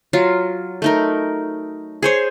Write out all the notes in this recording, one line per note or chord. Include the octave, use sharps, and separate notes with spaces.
F#3 F4
A3 D#4 A#4
G#4 C5 C#5